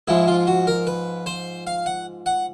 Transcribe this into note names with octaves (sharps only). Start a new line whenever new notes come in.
G#2 F3 G#3 E4
F4
F#4
A#4
B4
C5
F5
F#5
F#5